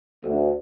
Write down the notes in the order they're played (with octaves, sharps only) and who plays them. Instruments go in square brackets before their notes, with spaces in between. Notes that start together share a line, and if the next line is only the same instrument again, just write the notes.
[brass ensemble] D2